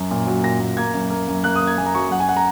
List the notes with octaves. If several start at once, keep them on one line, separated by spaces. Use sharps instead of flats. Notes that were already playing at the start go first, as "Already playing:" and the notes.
Already playing: F#2
A#2
F#3
A#2 A#6
A#2
A#3 G#6
F#2
A#3
F#2
A#3 F#6
D#6
A#3
G#6
A#3 G#5
A#5
F#3 C#6
F#2 F#5
G#5
F#5
A#5